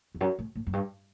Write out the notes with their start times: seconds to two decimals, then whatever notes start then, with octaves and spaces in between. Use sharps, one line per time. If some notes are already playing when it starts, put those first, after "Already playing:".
0.15 E2
0.21 F#2
0.39 A2
0.55 A2
0.67 F#2
0.73 G2